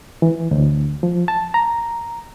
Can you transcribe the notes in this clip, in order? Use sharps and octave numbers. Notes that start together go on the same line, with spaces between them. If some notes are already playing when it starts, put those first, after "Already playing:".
E3
D2
F3
A5
A#5